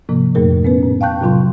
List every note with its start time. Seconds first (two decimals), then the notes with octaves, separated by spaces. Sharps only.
0.09 G#2 C3 F3 A#3
0.35 F2 A#2 A3 G#4 A#4
0.65 B3 C#4 B4
0.83 A2
1.01 F5 G5 A5 C#6 F#6 G6
1.21 A2 C3 F#3 F4 C6 C#6